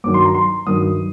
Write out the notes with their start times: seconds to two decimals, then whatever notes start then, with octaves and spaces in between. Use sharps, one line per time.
0.04 G2 D#3 F#3 D6
0.14 C6
0.25 A#5
0.35 C6
0.67 G2 D#3 F#3 D#6